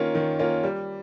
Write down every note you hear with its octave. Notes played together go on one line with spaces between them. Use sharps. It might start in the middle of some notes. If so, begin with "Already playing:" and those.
Already playing: D#3 A#3 C#4 F4
D#3
A#3 C#4 F4
G3